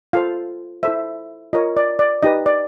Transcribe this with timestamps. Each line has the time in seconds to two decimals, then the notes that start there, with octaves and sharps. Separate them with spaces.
0.13 F4 A4 C5 F5
0.83 E4 A4 C5 E5
1.53 F4 A#4 C#5 D#5
1.77 D5
1.99 D5
2.23 D#4 G4 B4 D#5
2.46 D5